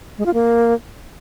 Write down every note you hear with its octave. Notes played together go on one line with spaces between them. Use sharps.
G#3
F4
A#3